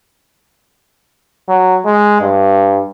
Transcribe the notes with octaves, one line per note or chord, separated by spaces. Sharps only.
F#3
G#3
G2